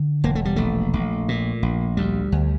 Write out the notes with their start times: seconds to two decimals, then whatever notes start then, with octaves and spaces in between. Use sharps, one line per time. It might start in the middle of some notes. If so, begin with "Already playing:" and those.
Already playing: D3
0.24 E1 A#3
0.35 A3
0.45 G3
0.56 A#1 A3
0.94 A#1
1.28 A#2
1.63 A#1
1.97 D2 G3
2.32 D2